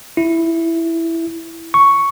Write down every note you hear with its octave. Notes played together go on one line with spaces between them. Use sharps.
E4
C#6